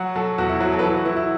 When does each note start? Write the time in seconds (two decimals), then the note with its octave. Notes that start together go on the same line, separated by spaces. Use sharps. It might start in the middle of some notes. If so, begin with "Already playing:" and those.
Already playing: F#3 F#5
0.16 F#3 A4
0.38 E2 F#4
0.49 E4
0.61 F#3 F#4
0.72 A4
0.79 B4
0.83 E3 A4
0.94 F#4
1.06 E3 E4
1.16 E4